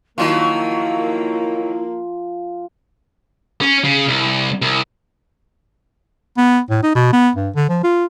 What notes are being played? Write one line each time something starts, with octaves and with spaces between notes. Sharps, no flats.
D#3 F3 F#3 A#3 E4 F4
C#4
C#3
C2
C2
B3
A2
D#4
B2
B3
G2
D3
F3
F4